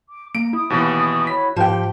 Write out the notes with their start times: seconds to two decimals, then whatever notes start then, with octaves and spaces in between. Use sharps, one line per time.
0.08 D6
0.35 A#3 A#5 D7
0.53 E4 D#6
0.70 D#2 B2 E3
1.27 F#4 C#5 B5 B6
1.56 G#2 F3 G4 G5 A#5